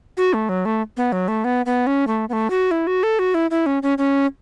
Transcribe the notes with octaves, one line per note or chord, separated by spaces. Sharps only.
F#4
A3
F#3
A3
B3
F#3
A3
B3
B3
C#4
A3
B3
A3
F#4
E4
F#4
A4
F#4
E4
E4
C#4
C#4
C#4